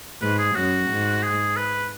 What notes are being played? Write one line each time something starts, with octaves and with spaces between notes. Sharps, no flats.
G#2 B4
G#4
F#2 F#4
G#2
G#4
B4